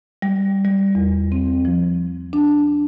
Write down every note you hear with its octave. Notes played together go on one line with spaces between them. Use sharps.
G3
G3
E2
C4
F3
D4